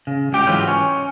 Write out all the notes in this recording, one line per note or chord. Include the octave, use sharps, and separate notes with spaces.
C#3
C#2 G4 G5
G#2 E3 F#3 F4
C#4